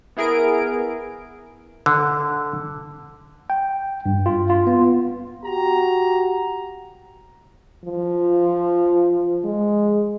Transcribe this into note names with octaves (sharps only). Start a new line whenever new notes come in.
B3 E4 G#4 A#4 D7
D3
G5
G2
F4
F4
B3
F#4 G4 A#5
F3
G#3